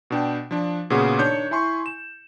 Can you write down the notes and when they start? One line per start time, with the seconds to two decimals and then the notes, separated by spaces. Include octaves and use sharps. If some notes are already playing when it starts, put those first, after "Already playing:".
0.10 B2 D4 G5
0.51 F3 D4
0.90 A#2 C#3 B3 C#4 F#4 G#4
1.19 D#3 D4 C#5 G6 C#7
1.51 E4 G#5 C6 C#6
1.86 E7